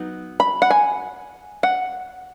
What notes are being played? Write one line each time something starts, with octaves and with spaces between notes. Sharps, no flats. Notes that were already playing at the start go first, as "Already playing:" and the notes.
Already playing: F#3 B3 D#4
B5
F#5
G#5
F#5